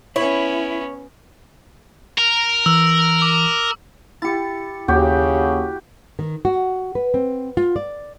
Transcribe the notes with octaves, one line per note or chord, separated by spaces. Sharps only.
B3 C#4 E4 C#5
A#4
E3 E6
D6
E4 G4 A6 C#7
D#2 C#3 F#4 G4
D#3
F#4
B4
C4
F4
D5